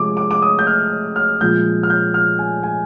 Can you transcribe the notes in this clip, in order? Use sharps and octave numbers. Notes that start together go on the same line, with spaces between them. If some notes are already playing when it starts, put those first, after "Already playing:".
Already playing: C3 F3 G#3 D6
D6
D6
D#6
G6
F6
F6
A#2 F3 G#3 G6
F6
G6
F6
G#5
G#5